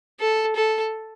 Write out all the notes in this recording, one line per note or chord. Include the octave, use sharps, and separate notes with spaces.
A4
A4